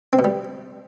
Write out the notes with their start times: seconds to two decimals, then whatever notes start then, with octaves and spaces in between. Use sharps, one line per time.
0.13 C4
0.19 B2
0.24 G3